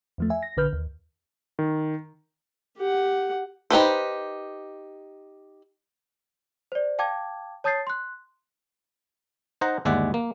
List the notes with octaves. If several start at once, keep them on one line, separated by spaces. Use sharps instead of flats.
E2 F3 A3
E5 G#5
A#6
A#1 D3 B4 F6 G6
D#2
D#3
G4 F#5
D#4 G4 B4 C5
C5 D5
F5 G5 A5 D6 G#6
C#5 A5 D#6 G6 A6 C7
C6 F#6
D#4 C5 F#5 A#5
G1 D#2 G#3 D5 E5 F#5
A#3